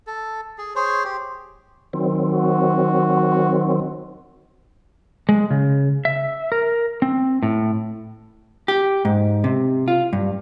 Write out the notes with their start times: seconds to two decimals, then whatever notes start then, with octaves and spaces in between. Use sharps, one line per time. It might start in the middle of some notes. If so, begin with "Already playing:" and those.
0.07 A4
0.58 G#4
0.76 G#4 C5 C#5
1.05 G4
1.93 D#3 F#3 C4
2.32 F#4
5.29 G#3
5.51 C#3
6.05 E5
6.52 A#4
7.02 C4
7.43 A2
8.68 G4
9.05 G#2
9.44 C3
9.88 F4
10.13 G2